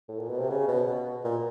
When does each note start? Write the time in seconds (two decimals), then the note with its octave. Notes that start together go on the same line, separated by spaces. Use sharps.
0.09 A2
0.19 A#2
0.29 B2
0.40 C3
0.50 C#3
0.68 B2
0.87 B2
1.24 A#2